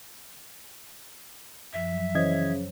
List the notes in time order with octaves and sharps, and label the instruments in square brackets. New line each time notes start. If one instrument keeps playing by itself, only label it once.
[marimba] F#2 F3 [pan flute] E5
[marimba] F#3
[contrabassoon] C#3 [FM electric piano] E3 D#5 G#6 [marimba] C5 C#5